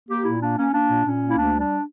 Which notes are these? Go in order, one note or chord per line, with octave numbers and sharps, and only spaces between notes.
A#3 G4
A#2 E4
A#3 D4
A#3 C#4
A#3 D4
A#2
A#2 C#4
A#3
E4
D2 D4
G3
D4